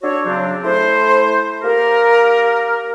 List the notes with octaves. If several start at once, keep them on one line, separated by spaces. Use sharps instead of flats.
D4 F#4 A4 C#5
C#3 F#3 C4 D4
A3 E4 C5
A#3 G4 A#4